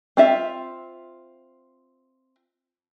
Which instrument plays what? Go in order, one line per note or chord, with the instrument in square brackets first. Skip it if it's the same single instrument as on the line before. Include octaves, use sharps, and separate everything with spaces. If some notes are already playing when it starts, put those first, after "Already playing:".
[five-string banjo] C4 F4 E5